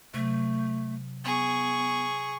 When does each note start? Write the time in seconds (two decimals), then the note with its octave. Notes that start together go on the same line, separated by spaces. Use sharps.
0.14 C3 F#3 A3
1.25 B3 G#4 C#6